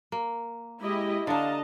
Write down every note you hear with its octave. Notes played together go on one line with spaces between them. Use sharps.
A#3
G#3 E4 G4 D#5
D3 D4 D#5 F5 A5 A#5